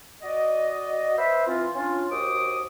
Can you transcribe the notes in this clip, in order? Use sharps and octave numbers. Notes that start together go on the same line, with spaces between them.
F#4 D5 D#5
B4 C5 E5
E3 C4 F4
C#4 D4 F4
D#2 F#4 C5 D6 D#6